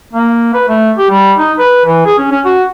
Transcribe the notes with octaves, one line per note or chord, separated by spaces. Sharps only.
A#3
B4
A3
G4
G3
D#4
B4
E3
G#4
C#4
C#4
F#4